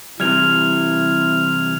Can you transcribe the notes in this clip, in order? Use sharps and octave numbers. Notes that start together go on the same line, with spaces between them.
C3 E3 G3 E4 F6 G#6 F7